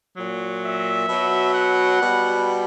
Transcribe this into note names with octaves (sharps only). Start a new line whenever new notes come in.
A#2 F#3
E5
B2 F#3
F#5
B2 G3